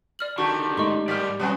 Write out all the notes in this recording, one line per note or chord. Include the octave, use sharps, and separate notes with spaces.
D5 F6 F#7
D3 D#3 D4 F#4 G4 C#6
G#2 A3 D#4 D#5 C6 C#6
D#3 G3 G4 A#4 D5 F6 B6
B2 F#3 G3 B3 C#4 F#4 G#5